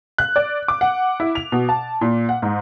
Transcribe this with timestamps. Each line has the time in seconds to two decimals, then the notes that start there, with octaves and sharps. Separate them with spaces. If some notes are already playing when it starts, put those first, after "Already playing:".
0.18 F#6
0.36 D5
0.68 D6
0.81 F#5
1.20 E4
1.35 F7
1.52 B2
1.69 A5
2.01 A#2
2.29 F#5
2.42 G#2